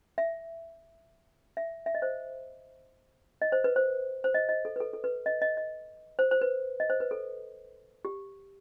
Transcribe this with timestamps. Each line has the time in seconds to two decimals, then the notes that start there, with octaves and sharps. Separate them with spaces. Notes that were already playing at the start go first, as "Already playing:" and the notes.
0.18 E5
1.57 E5
1.86 E5
1.95 D#5
2.02 C5
3.42 D#5
3.52 C5
3.64 B4
3.76 C5
4.24 C5
4.34 D#5
4.49 D#5
4.65 A4
4.76 B4
4.80 A4
4.93 A4
5.04 B4
5.26 D#5
5.42 D#5
5.57 D#5
6.19 C5
6.31 C5
6.41 B4
6.80 D#5
6.90 C5
7.00 B4
7.11 A4
8.05 G4